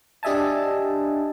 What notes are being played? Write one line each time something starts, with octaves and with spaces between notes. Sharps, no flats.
D4 G4 D#5 E5 G#5 A5